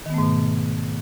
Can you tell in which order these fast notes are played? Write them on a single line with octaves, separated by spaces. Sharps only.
D#3 B3 A3 G#2 B2